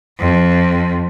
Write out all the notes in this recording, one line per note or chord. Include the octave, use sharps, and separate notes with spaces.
F2